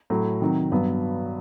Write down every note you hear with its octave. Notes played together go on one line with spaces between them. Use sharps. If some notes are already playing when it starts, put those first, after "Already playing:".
A2 F#3 A3
C3 D#3 F#3
G2 F#3 B3